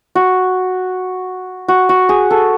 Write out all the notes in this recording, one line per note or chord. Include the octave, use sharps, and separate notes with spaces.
F#4
F#4
F#4
G#4
A4